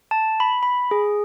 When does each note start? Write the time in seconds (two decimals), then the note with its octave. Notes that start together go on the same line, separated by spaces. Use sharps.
0.11 A5
0.40 B5
0.63 B5
0.91 G#4